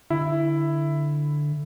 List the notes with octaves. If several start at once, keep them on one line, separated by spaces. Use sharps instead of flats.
D3 E4 E5